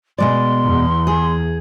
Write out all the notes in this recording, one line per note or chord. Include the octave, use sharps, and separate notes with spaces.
B2 G#3 D5 C6
E2
G#4